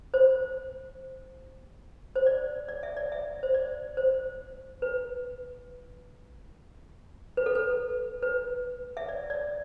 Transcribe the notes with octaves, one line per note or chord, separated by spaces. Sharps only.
C5
C5
D5
D5
E5
D5
E5
C5
D5
C5
B4
B4
A4
B4
B4
E5
D5
D5